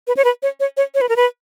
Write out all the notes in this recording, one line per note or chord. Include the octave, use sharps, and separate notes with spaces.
B4
C#5
B4
C#5
C#5
C#5
C#5
B4
A#4
B4